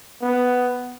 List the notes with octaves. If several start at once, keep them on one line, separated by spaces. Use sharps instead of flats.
B3